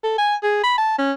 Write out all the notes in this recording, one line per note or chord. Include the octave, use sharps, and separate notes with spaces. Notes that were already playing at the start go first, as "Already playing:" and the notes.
A4
G#5
G#4
B5
A5
C#4